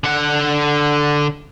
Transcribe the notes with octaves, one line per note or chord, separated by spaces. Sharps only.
D3 F#5